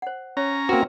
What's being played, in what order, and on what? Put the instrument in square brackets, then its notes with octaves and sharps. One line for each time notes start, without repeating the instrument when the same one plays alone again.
[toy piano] C5 F#5
[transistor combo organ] C#4 A#5 [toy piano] C#5
[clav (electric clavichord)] A#3 F#4 [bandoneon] C4 [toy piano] B4